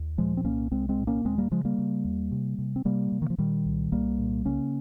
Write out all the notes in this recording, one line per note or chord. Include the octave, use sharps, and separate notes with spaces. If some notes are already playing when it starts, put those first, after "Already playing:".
Already playing: D#2
A#2 F3 G#3
C4
C2 A#3 C#4
C2 G#3 C4
G#3 C4
A#2
A#3 C#4
D#2 G#3 C4
G3 A#3
C#3 F3 G#3
G3 A#3
C#3
D#2
C3
C3
C4
C3 G3 A#3
C3
D#3
F3
A#2 D#3 G3
C2
C2 G3 A#3
A#2
C#3 A#3 C#4